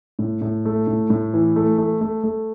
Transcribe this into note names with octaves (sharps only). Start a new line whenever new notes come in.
A2
A2
A3
A2
A2
E3
A3
A3
A3
A3